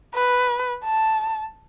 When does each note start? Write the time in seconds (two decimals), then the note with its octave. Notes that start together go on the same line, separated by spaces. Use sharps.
0.14 B4
0.85 A5